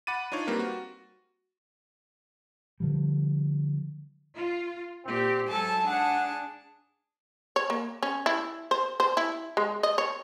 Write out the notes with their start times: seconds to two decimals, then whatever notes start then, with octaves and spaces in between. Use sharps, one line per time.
0.07 F#5 B5 D6 A6 D#7
0.32 D4 D#4 F4 C#5
0.47 G3 A#3 C4 A#4 B4
0.59 F#4
2.80 D3 F3 G3
4.35 F4
5.05 A#2 C4 G4
5.49 G#2 F#3 A4 G#5 A5
5.87 D4 G#4 F#5 A5
7.56 C#5
7.70 A#3
8.03 C#4
8.26 E4
8.71 C5
9.00 C5
9.17 E4
9.57 G#3
9.83 D#5
9.98 C#5